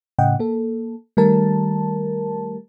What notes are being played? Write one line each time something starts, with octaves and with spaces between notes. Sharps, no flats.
A2 C#3 D#5 F#5 G5
A#3 A4
D#3 G3 A3 A#4 A5